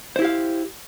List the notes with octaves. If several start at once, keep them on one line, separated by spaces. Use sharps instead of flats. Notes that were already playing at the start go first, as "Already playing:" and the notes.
E4 G4 C5 F5